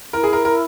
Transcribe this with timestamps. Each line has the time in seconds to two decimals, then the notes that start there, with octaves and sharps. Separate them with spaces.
0.13 E4 A#4
0.23 G#4
0.33 A#4
0.45 A#4